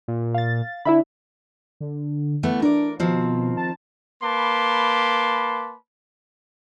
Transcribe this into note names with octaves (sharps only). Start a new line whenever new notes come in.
A#2
F5 A6
D3 E4 E5 B5
D3
E3 A3 B3
D4 A#4 D5
B2 D#3 F3 C4
A5
A#3 B4 A5 B5 C6 D6